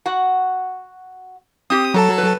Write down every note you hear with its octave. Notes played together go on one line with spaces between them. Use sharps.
F#4 F#5
C4 G4 D#6
F#3 A4 A5 A#5
B4